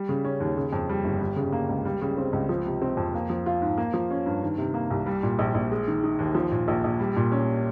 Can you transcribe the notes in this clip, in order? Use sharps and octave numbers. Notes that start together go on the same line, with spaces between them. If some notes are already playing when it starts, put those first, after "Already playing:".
Already playing: G3
C#3
C#4
D#2
C#3
F2
G3
G1
G3
C#3
A#3
C#2
G3
C#3
C4
C#2
F3
C3
C4
F2
A#3
F3
F4
G#2
A#3
F3
C#4
G2
D#3
C3
A#3
C2
G3
A#2
A#1
A#1
G#3
D#3
D#4
D#2
F3
A#2
A#1
A#1
G3
A#2
C#4